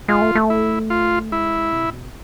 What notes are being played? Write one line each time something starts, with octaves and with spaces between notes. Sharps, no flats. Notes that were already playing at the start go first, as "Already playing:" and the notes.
G#3 F4
A3
A3
E4
F4
G#3 E4
C3
A2
B2